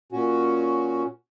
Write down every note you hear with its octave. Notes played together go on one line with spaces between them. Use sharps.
A#2 C#4 F#4